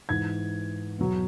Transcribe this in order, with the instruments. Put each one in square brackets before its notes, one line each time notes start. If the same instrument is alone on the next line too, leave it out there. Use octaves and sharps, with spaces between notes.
[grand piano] G#2 E3 G#6
E2 B2 F#3